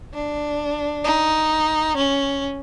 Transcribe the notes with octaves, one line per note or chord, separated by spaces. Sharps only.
D4
D#4
C#4